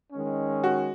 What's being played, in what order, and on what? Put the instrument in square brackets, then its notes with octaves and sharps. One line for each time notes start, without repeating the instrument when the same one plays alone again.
[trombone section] D#3 G#3 C#4
[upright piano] F#4